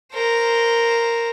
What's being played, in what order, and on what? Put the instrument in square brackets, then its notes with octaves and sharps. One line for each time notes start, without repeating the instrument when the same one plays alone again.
[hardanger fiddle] A#4 C5